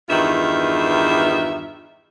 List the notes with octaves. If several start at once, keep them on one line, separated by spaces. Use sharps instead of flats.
E2 G2 D#3 F4 E5